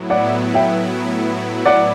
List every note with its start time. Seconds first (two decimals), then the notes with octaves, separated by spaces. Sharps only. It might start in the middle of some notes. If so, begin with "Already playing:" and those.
Already playing: A2 F#3 B3 E4
0.10 D5 F#5
0.54 E5 G5
1.65 D5 F#5